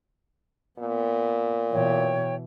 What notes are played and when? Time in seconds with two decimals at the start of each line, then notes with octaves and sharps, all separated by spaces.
0.79 A#2 B3
1.71 B2 E3 C#5 G5